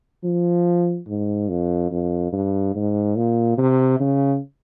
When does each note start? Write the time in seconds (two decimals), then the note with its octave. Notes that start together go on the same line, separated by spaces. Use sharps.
0.24 F3
1.08 G#2
1.49 F2
1.92 F2
2.32 G2
2.75 G#2
3.16 A#2
3.58 C3
4.00 C#3